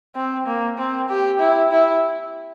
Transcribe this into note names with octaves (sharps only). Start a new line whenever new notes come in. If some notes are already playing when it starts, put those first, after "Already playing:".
C4
A#3
C4
G4
E4
E4